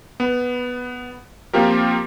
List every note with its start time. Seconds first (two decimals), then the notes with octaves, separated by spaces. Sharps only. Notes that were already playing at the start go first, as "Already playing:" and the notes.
0.20 B3
1.53 F3 A#3 C4 F4 G4 A#4